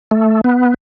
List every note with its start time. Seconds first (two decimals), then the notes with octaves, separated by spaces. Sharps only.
0.11 A3
0.44 B3